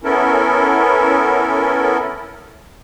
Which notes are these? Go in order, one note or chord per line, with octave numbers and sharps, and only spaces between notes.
B3 C#4 E4 A4 A#4